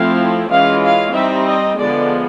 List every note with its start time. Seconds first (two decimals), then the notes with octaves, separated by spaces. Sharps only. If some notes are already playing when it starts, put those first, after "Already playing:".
Already playing: F3 A3 C4 E4 F5
0.50 E3 G#3 C#4 F4 F5
0.83 F5
1.14 G3 C4 D#4 E5
1.47 D#5
1.78 D3 F3 G#3 B3 D5